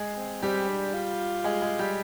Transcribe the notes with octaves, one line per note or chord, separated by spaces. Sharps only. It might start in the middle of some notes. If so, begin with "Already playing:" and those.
Already playing: G#3 G#4
C4
G3 C4 G4
D4
F4
G#3 G#4
G#3 G#4
G3 G4